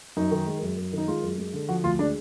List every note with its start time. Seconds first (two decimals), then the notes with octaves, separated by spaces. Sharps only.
0.17 F#2 D#4
0.31 D#3
0.47 G#3
0.62 F#2
0.77 F#2
0.93 D#3 D#4
1.07 G#3 F4
1.23 F#2
1.38 G#3
1.53 D3
1.68 F3 F#4
1.84 D2 F4
1.99 G#3 D4